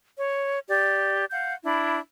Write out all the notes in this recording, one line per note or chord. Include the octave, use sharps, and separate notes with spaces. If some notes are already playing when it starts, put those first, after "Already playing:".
C#5
G4 D5
F5 F#5 G6
D4 E4 B5